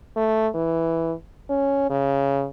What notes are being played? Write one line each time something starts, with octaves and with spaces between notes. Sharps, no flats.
A3
E3
C#4
C#3